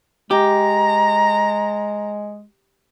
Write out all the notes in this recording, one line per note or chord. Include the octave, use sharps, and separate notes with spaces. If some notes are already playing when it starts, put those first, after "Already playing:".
G#3 G4 A#5